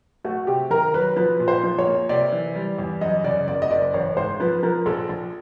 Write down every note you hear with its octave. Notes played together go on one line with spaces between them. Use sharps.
A3 F#4
C3 G4
D#3 A#4
F#3 B4
F3 B4
A#2
C5
F3
C#5
A#3
C3 D5
E3
G3
E2
F#2 D#5
C#3 D5
F#1 D5
D#5
F#1 D5
A1 C#5
G#2 C5
F3 B4
F3 A#4
A#1 A4
A#1